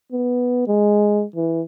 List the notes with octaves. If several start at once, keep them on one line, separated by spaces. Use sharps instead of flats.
B3
G#3
E3